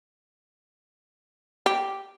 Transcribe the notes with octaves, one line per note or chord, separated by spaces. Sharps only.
G4